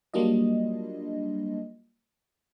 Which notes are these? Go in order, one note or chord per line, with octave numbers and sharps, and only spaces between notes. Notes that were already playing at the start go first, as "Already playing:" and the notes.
F#3 G3 A#3 D4 F4 D#5